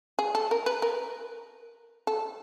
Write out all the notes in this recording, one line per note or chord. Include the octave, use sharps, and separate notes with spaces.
G#4
A4
A#4
B4
A#4
A4